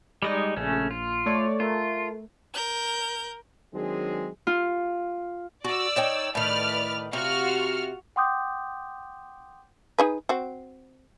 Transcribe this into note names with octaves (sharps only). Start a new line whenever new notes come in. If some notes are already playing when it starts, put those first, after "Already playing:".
G3 G#3 D#4 D5 D#5
A#1 C#3 A3 C#4
F4
A3 C#5 D5
A3 F4 A#4
A#4 G6
D#3 F#3 G#3 C4 D4 G#4
F4
F#4 D5 E6
D#4 C#5 G5
A2 D#3 B4 D5 F6
C3 F4 F#4 F6
F#5 G5 C6 D6 D#6 G6
D#4 G#4 B4
C4 F#4